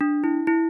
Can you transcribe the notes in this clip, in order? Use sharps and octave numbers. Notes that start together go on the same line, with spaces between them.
D4
E4
E4